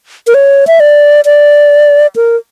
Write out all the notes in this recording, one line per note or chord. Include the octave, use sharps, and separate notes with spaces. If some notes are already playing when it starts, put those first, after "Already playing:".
A#4
C#5
E5
D5
D5
A#4